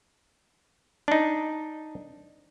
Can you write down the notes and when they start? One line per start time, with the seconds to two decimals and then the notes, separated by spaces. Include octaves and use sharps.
1.08 D4 D#4